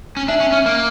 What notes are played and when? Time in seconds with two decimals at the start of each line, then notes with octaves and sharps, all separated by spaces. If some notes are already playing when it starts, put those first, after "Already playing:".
0.17 C#4
0.28 D4 E5
0.40 C#4
0.52 C#4
0.66 A#3